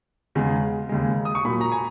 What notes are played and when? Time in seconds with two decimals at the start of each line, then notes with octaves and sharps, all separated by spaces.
0.35 E2 C#3 G#3
0.89 D#2 C#3 G#3
1.25 D#6
1.35 C#6
1.45 A#2 F#3 B5
1.61 A#5
1.72 G#5